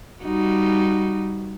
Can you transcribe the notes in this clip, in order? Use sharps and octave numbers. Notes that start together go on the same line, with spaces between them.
G3 D#4 F#4